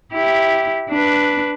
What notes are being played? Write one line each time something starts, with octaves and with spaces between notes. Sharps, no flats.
E4 G4
D4 B4